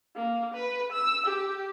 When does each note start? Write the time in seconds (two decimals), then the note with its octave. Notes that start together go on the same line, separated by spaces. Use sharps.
0.15 A#3
0.54 B4
0.92 E6
1.26 G4